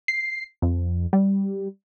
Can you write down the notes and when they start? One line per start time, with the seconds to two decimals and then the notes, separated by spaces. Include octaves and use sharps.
0.08 C7
0.62 F2
1.13 G3